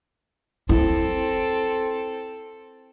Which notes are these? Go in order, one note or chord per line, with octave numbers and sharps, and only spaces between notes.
C4 E4 A4